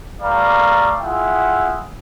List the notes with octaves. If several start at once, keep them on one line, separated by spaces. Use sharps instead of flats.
G3 A3 B4 D5 F5 A#5
E4 F4 G#4 E5 F#5 G5